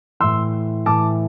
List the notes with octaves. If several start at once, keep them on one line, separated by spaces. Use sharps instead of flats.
A2 E3 C6 E6
A2 E3 A5 D6